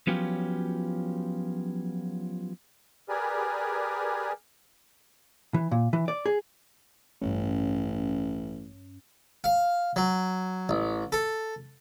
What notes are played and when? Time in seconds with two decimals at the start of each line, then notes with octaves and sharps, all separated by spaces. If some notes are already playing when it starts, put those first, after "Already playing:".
0.07 F3 F#3 B3 C#4 F4 G4
3.09 G4 G#4 A#4 B4 D5 G#5
5.54 E3
5.71 A#2
5.93 E3
6.08 D5
6.26 G#4
7.22 A1 G2 C#4
9.44 F5
9.96 F#3
10.69 A1
11.12 A4